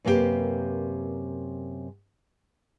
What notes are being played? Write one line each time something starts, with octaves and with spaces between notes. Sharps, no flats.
F#2 C3 A#3 B3 G4 B4